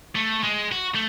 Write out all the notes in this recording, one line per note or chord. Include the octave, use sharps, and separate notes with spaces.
A3
G#3
F#4
A3